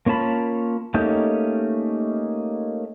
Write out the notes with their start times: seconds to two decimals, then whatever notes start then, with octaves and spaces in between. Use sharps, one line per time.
0.06 A#3 C#4 F4 A5 B5
0.94 A3 A#3 C#4 D#4 G4